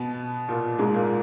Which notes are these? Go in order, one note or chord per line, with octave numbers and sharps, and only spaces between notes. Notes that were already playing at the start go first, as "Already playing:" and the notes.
Already playing: B2 B3
A#2 A#3
G#2 G#3
A#2 A#3